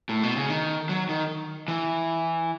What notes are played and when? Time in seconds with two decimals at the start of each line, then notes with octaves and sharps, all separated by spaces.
0.09 A2
0.23 B2
0.36 C#3
0.50 D#3
0.89 F#3
1.09 D#3
1.68 E3